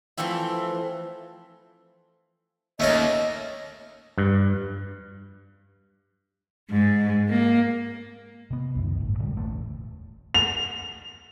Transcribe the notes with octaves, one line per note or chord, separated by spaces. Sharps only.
E3 F3 A3 C4 E4
D#2 A3 C#4 A#4 D#5
G2
G#2
A#3
C3 B3
C#2 F#2 D#3
G1 A2
A#2 D3 G3 G#3
E1 A1 D2 A3
F7